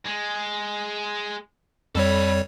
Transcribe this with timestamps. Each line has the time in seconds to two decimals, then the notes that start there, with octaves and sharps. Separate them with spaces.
0.06 G#3
1.95 F2 G3 A4 C#5 B5